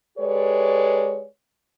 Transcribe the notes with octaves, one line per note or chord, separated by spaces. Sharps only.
G#3 G4 A4 B4 C#5 D5